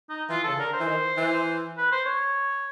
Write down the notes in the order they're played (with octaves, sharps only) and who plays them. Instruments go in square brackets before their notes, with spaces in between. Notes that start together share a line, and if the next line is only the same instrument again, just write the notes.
[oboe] D#4
[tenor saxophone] E3 [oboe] F4
[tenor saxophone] C#3 [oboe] A4
[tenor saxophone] D3 [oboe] A#4
[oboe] C5
[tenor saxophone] E3
D#3
E3
[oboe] B4
C5
C#5